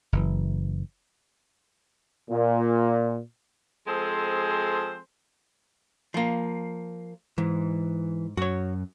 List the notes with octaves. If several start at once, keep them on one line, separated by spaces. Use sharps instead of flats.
F#1 E3
A#2
F3 G#3 C4 G#4 A4 C5
F3 A#3
G#2 E3
F#2 F#4 C#5